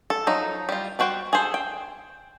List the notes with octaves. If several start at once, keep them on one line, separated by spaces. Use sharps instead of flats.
A4
F3 F#3 D#4
G3 F4
G3 D4 F#4 C5 G5
G#4 A4 C5
G5